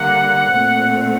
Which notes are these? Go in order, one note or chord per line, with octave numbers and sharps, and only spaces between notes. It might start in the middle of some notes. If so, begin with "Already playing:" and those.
Already playing: D3 G3 A#3 F#5
A#2 A3 C4